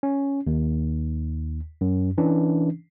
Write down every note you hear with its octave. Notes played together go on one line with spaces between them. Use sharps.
C#4
D#2
F#2
E3 C#4 D4